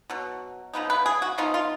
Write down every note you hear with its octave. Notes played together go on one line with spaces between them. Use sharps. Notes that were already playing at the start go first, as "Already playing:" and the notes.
B2 F#3
C#3 F3 B3 D#4
B4
G#4
F#4
F3 B3 D#4 F4
F4